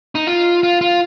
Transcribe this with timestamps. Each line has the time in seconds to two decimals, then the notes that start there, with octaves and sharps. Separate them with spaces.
0.15 D#4
0.27 F4
0.63 F4
0.81 F4